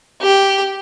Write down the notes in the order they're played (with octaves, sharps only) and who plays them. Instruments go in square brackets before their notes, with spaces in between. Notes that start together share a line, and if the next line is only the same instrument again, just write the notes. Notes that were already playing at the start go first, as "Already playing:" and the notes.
[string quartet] G4